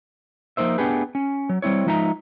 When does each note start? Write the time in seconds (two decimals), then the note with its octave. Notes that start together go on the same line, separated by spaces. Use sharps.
0.57 F3 A#3 D#4 C5 E5
0.78 A3 B3 D4 G4 G#4 B4
1.15 C#4
1.49 F#3
1.62 G3 C4 E4 C#5
1.86 F3 G#3 D#4 E5 F5 A#5